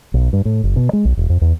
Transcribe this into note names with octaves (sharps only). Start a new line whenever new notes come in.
B1
G2
A2
F#1
B2
G#3
B1
E1
F2
E2